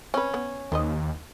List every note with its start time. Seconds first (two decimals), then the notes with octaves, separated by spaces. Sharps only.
0.14 C4 C#4 B4
0.34 B3 F#5
0.72 D#2 D#3 C5 D#5